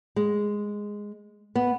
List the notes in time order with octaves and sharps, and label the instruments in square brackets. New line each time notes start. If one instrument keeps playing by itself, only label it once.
[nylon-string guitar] G#3
B3